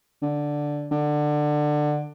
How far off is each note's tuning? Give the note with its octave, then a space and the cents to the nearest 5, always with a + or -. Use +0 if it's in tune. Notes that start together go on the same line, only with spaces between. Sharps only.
D3 +0
D3 +20